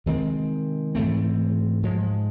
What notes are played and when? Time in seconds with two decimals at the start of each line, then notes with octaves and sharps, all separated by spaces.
0.06 C3 D#3 G#3 C4
0.95 G#2 E3 A3 C4
1.83 G#2 F3 G#3